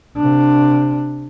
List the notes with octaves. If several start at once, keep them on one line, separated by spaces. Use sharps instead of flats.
C3 D4